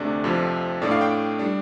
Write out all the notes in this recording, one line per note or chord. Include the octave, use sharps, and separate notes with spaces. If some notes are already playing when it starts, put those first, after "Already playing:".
Already playing: D2 C3 A3 D4 D5
F2 C3 F3 C4
A2 A3 D4 D5
F5
G5
G3 D4